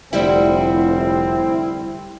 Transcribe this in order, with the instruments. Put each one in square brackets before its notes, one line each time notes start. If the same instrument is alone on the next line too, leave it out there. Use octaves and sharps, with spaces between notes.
[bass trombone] F1 [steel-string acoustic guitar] D2 G3 F#5 [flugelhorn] C4 [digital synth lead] E4